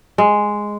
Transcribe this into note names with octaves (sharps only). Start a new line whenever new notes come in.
G#3